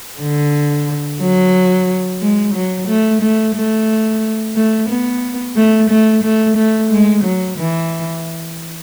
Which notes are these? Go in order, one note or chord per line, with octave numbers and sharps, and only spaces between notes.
D3
F#3
G#3
F#3
A3
A3
A3
A3
B3
A3
A3
A3
A3
G#3
F#3
E3